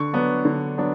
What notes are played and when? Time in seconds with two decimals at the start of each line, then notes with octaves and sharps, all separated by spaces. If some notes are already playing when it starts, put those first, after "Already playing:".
Already playing: D3 C#6
0.13 F#3 B3 D4
0.45 D3
0.78 F#3 B3 D4